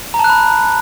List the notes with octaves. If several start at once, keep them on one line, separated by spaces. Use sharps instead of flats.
A#5
A5
F#6
B5